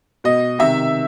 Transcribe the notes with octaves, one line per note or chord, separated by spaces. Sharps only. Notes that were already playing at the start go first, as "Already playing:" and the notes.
B2 D#5
C3 D#3 E5